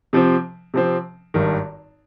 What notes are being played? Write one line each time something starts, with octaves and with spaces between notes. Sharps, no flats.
C3 F3 C4
C3 F3 C4
G#1 G2 D#3